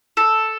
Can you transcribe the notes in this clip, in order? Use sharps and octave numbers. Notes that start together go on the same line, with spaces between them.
A4